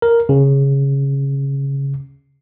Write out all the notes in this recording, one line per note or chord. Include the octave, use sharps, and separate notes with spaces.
A#4
C#3